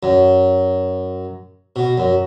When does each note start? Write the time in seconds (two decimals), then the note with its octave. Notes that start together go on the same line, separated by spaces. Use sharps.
0.03 F#2
1.76 B2
1.98 F#2